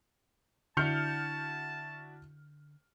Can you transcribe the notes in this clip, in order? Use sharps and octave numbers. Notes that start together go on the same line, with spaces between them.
D3 D4 E4 F#4 A5 F6 G6 C#7